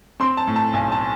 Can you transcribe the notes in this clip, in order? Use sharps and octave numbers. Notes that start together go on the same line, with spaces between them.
C4 C6
A5
A2
A5
B1 G#5
A5